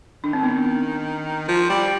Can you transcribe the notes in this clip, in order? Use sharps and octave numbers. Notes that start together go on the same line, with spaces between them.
D#3 D4
C4
B3 D4
F3
G3